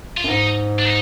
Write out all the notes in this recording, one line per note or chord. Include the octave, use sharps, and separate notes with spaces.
F4
F#2
G#2 D#4
D4
D#4